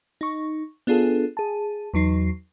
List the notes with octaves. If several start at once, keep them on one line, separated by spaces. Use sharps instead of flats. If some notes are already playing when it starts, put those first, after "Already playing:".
D#4 C#6
B3 D4 F4 G#4 A4
G#4 A5
E2 F#3 D#4 C7